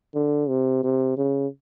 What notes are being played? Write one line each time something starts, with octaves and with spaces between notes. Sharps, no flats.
D3
C3
C3
C#3